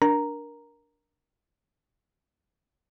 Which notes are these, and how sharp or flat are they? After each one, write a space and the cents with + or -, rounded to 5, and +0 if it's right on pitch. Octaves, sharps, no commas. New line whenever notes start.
D4 +0 A#4 +15 A#5 +0